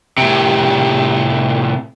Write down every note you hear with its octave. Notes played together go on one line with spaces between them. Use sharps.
A2 C3